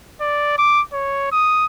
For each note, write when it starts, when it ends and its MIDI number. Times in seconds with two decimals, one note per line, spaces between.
0.21 0.56 74
0.58 0.81 86
0.93 1.31 73
1.32 1.66 87